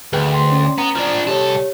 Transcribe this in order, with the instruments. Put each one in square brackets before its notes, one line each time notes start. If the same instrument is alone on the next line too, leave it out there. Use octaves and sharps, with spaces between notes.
[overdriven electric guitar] D2 [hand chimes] G#4 B4 G5
[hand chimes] G5 C6
C#4
[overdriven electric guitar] B3 [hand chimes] A#5
[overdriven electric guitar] F3 D4
[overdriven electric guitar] C2 A4 [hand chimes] G4 C#5